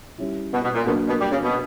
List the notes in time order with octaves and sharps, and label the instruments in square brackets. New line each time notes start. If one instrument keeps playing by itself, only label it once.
[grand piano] G3 C#4 E4
[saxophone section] B2
B2
A#2
[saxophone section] B2 [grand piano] F#3 A#3 D4 A#4
[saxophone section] B2
G3
C#3
B2